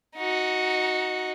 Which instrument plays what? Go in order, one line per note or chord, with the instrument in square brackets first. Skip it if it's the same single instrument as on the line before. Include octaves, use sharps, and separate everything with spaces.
[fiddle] D#4 F#4